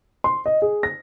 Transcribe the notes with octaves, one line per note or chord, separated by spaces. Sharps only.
C6
D#5
G#4
A#6